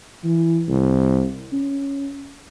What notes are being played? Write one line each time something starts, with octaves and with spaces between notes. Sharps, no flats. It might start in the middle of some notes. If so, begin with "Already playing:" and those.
E3
C2
C#4